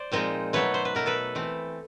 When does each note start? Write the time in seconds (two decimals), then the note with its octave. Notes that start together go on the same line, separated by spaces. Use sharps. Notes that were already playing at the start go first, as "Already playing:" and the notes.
Already playing: C5 D5
0.12 A#2 F3 G#3 C4 D#4
0.53 B2 F#3 A3 B4 C#5
0.74 C5
0.85 B4
0.95 B2 F#3 A3 A#4
1.06 A4 B4
1.35 E3 A3 C4